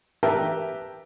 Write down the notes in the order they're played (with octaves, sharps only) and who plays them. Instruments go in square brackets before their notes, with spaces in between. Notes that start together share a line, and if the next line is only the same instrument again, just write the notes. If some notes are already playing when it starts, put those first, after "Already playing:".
[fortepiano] G4 A#4 B4 E5 G5 A5